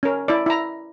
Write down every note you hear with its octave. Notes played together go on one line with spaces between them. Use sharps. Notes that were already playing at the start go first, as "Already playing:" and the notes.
C#4 A#4
E4 D5
E4 A#5